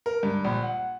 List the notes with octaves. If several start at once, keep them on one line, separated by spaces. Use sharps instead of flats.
A#4
G2
A#1
F#5